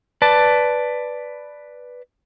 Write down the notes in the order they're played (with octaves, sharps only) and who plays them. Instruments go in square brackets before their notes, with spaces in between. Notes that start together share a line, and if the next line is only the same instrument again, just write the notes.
[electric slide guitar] B4 D5 A5